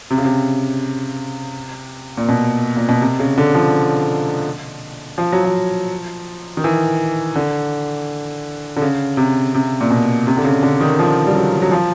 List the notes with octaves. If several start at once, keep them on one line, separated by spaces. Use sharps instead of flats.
C3
C#3
C3
A#2
B2
A#2
B2
C3
C#3
D3
F3
F3
F#3
F3
D#3
E3
D3
D3
C#3
C3
C3
A#2
B2
C3
D3
C#3
D3
D#3
F3
G3
F#3
F#3
F3